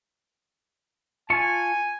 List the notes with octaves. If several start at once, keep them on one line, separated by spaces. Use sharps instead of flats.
F4 G#5 A5 C#6